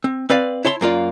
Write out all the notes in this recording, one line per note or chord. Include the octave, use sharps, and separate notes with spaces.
C4
C4 B4 D5 F5
E4 C#5 A5 C6
F#2 A#3 F4 D5